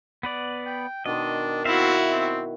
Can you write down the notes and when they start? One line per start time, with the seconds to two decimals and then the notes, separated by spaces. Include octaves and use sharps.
0.23 B3 B4 D5
0.66 G5
1.06 B2 D#3 D4 D#5 C6
1.65 C4 E4 F#4 E5 F5
2.11 C4